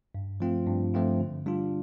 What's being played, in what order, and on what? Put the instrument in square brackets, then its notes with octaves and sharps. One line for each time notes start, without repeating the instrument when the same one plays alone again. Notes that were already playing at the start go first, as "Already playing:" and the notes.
[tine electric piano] G2
F3 A3 C4 F4
G2
F3 A3 C4 F4
D3
G3 D4 F4